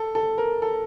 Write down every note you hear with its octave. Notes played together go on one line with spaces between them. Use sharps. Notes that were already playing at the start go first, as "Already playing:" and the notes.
Already playing: A4
A4
A#4
A4